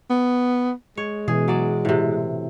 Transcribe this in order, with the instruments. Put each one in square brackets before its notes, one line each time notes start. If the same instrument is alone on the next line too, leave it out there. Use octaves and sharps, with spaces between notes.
[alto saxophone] B3
[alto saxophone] G#3 [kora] C#5
[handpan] B2 E3 [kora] G#4
[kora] F#3 D5
A2 C3